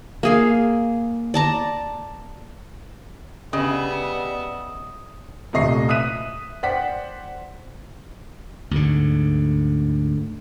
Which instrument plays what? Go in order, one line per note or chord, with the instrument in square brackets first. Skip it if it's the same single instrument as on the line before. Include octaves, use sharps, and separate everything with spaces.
[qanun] A#3 G#4 F5
D5 A5 A#5
[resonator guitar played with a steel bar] C#3 [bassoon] G3 [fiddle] B3 E5 [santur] D#5
[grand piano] D#1 C3 A3 D#5 C#6 C7
E5 D#6 F#6 B6 D#7
C5 D5 F#5 G5 B6
[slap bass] D2 G#2 D3